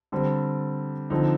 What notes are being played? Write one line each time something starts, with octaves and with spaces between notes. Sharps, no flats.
D3 G3 C4
D3 F3 C4 D#4